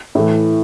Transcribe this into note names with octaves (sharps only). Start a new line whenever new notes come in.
A2 E3 A3